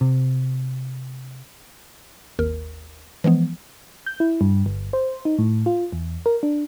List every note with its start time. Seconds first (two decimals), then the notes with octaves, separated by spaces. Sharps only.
0.01 C3
2.39 G#1 D#2 A#4
3.24 E3 F3 G#3 B3
4.06 G6
4.20 E4
4.41 G2
4.66 G1
4.93 C5
5.25 D#4
5.38 A2
5.66 F4
5.92 E2
6.26 A#4
6.43 D4